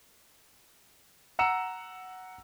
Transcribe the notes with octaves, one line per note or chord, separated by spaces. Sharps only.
F#5 A#5 E6 C#7 E7